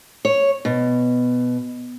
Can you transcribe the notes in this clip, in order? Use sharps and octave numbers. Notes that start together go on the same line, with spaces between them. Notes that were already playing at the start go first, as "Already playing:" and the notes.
C#5
B2